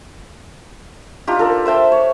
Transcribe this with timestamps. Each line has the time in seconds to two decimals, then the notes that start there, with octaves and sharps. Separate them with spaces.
1.27 D4 D#4 F4 G4
1.39 A4 A#4 D5
1.66 C5 E5 G5 A5
1.92 C#5